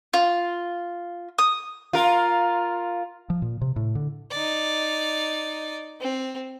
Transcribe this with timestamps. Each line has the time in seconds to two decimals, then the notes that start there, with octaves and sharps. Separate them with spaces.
0.14 F4
1.38 D#6
1.93 F4 A#4
3.30 F3
3.42 A#2
3.61 C3
3.76 A2
3.95 D3
4.31 D#4 D5
6.01 C4